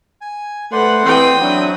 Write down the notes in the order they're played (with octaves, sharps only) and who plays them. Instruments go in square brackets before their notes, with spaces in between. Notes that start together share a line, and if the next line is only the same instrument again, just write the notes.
[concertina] G#5
[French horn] A3 [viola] B4 F#5 [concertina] C5 D5 C6
[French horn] E3 [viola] C4 [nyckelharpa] G5 D#6
[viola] F#3 [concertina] C4 E4 F#4 [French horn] D4